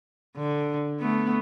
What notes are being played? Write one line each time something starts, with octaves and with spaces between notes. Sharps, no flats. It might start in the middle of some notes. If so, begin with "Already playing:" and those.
D3
A3 B3